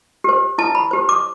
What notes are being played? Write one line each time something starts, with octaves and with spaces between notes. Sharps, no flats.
G4 C5
E4 A5
B5
G4 C5
D6